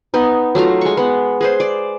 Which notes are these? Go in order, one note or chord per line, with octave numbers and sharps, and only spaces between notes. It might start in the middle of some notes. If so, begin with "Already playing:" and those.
B3 D#4
F#3 A3 F4 A#5
G#3 C#6
B3 F#5
G#4 B4 C5
D5